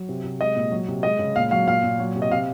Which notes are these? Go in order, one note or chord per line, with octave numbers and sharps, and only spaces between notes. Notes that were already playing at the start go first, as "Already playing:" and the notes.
Already playing: F#3
C3
C3
G#3 D#5
A#2
F#3
C3
G#3 D#5
C#3
A#2 F5
F#3 F5
A#2 F5
A#2
F#3
C3
D#5
C3 F5